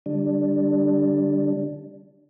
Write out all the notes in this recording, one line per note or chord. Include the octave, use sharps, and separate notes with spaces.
D3 G3 D4